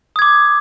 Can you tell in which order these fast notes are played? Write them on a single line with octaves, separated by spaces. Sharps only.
D#6 G#6 D6